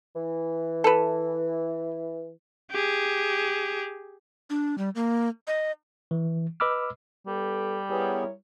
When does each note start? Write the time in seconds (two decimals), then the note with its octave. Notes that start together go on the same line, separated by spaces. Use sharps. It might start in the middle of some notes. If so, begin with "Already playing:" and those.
0.16 E3
0.84 A4 B4
2.71 G4 G#4
4.50 D4
4.78 G3
4.95 A#3
5.47 D#5
6.11 E3
6.60 B4 D#5 B5 D6 E6 F6
7.27 G3 B3 G4 A4
7.90 B3 E4 G4 G#4 A#4 C#5